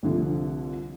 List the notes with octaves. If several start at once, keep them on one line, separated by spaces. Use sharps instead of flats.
C2 D3 F3